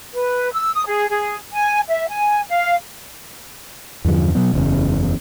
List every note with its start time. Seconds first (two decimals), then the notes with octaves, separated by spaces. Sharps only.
0.14 B4
0.52 E6
0.74 D#6
0.87 G#4
1.09 G#4
1.52 G#5
1.88 E5
2.07 G#5
2.48 F5
4.05 E2 G2 D3 F3
4.35 B2 F#3 B3
4.54 F#1 E2 C#3